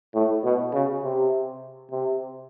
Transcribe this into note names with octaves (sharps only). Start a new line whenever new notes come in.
A2
B2
C#3
C3
C3